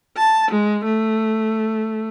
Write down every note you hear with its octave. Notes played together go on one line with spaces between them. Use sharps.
A5
G#3
A3